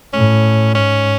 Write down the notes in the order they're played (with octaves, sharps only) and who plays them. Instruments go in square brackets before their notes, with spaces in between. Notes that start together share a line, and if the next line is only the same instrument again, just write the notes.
[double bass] A2 [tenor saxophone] C#4
[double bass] G#2 [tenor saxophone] C#4